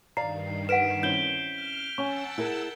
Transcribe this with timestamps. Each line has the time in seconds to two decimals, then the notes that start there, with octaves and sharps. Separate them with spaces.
0.17 G2 D#3 D5 F5 A#5 C7
0.69 B4 F#5 B6 D7 E7
1.03 C4 C#4 E4 G6 G7
1.48 F6
1.98 C#4 F#5 G#5 A5 C#6 E6
2.38 E4 G#4 A#4